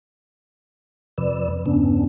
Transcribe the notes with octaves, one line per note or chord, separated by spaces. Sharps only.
F2 C3 F3 B4 D5 E6
E2 G2 C#3 B3 C#4 D4